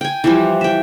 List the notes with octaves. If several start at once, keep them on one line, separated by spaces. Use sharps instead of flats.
G5 G#5
E3 F3 G3
E5 G5